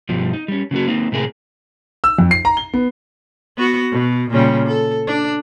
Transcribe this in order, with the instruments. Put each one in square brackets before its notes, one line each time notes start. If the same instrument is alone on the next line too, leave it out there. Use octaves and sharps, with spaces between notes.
[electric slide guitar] G2 B2 F3 G3
D#4
G3 C#4
C#3 F#3 A#3 F#4
A#3 C4 D#4
A2 C3 G#4 A#4
[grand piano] E6
F2
C7
A#5
G7
B3
[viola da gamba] B3 F#4
B2
A#2 C#3 G3
A4
D4